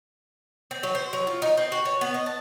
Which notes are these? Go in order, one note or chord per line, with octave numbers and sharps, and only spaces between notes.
C4
F#3
C5
F#3
F4
D#4
C4
F#4
C#5
B3
D#5
A5